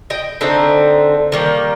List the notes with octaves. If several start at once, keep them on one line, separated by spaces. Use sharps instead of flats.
D#5 G5
D3 A3 C4 D#4
D#3 G3 A#3